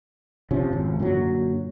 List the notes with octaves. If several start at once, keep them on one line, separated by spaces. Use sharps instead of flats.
F1 C3 F3 C#4
G#1
F#2 A#2 D3 F#3